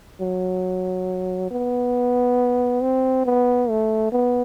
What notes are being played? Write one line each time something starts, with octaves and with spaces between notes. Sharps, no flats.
F#3
B3
C4
B3
A3
B3